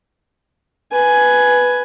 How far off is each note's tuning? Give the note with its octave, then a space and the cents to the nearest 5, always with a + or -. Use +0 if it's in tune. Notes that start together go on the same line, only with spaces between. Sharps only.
B4 +0 G#5 +10